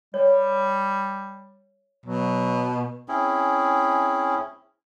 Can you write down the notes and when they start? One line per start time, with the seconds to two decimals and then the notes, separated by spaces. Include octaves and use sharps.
0.14 G3 C#5
2.06 B2 F#3
3.08 C4 C#4 E4 G#4